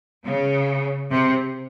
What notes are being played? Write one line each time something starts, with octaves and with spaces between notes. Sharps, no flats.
C#3
C3